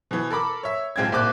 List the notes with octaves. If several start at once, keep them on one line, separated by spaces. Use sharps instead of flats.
B2 E3
A4 A#4 B5 D6
C#5 E5
B1 G#3 C4 F4 G#6
C2 A#2 C5 D6 F#6